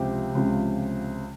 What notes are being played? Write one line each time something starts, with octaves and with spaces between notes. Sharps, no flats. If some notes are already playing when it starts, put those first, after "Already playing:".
Already playing: C#2 C3 F3 G4
C#2 C3 F3